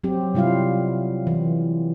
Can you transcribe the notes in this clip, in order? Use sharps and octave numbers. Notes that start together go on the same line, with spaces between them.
F#3 C4 G4
C3 G3 E4 F4 F5
E3